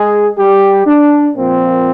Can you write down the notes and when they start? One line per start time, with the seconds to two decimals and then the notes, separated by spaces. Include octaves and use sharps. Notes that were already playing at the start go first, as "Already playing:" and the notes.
Already playing: G#3 G#4
0.38 G3 G4
0.86 D4
1.36 A#2 F3 A#3 C4